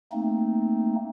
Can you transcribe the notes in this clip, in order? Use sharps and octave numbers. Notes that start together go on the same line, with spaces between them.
A3 A#3 C4 D#4